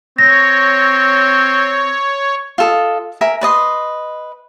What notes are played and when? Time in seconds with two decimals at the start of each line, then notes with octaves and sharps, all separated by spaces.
0.18 C4 C#5 A#6
2.58 F4 A4 D#5
3.21 A#4 E5 G#5
3.41 B4 D5 D#5 C6